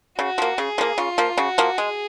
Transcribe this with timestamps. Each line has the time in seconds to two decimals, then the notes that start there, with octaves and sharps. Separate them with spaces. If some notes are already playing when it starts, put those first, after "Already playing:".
0.18 C#3 F#4
0.38 F3 A#3
0.58 C#3 G#4
0.78 F3 A#3
0.98 C#3 F4
1.18 F3 A#3
1.37 C#3 F#4
1.58 F3 A#3
1.78 G#3 G#4